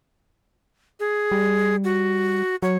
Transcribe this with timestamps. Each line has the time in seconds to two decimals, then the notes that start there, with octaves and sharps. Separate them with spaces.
1.00 G#4
1.32 G3
1.84 F#4
2.63 F#3 C#5